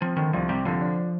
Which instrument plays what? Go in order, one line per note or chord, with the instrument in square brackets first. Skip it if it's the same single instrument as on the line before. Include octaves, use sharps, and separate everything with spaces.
[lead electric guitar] F3 [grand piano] C4
[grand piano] D3 [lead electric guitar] D#3
[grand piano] C2 [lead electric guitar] F3
[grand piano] C3 [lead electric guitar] G3
[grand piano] D3 [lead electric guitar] F3
[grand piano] D4